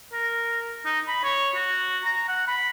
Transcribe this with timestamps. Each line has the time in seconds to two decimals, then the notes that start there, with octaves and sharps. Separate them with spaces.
0.13 A#4
0.85 D#4
1.07 B5
1.24 C#5
1.55 F#4
2.04 A#5
2.28 F#5
2.47 B5